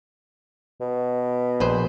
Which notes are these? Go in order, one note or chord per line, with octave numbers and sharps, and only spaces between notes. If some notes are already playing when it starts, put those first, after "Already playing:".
B2
A#1 B4 C5